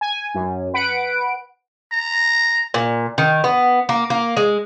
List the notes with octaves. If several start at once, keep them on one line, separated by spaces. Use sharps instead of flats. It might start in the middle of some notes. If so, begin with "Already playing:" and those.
G#5
F#2
B4 F#5 D7
A#5
A#2
D#3
B3
A#3
A#3
G#3